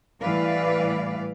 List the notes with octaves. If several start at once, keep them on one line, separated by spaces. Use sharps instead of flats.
A2 E3 G3 B4 D5 F5